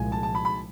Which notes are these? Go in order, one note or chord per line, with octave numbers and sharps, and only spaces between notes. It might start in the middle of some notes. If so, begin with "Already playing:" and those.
Already playing: C2 A#2 F3 G#3 G#5
A5
A5
B5
B5